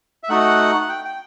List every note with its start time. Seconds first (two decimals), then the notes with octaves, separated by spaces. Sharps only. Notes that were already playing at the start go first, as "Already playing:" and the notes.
0.23 E5
0.29 A3 D#4 F#4 F#5
0.82 F#5
0.89 G5
1.05 G5